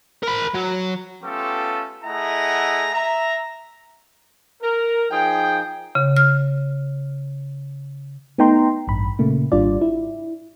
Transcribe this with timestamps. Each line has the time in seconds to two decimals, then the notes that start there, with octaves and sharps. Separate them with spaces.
0.23 A#4 B5
0.55 F#3
1.23 A3 B3 C#4 F4 G4 A4
2.05 A3 E4 G#4 D#5 F#5 A#5
2.92 E5 A#5
4.61 A#4
5.11 F3 D#4 G#4 G5
5.95 C#3
6.17 F6
8.38 A3 B3 D#4 G5 A#5 C6
8.87 A1 G2 B5
9.19 A#2 C#3 A3 A#3
9.52 G#1 G3 D4 F4 D5
9.81 E4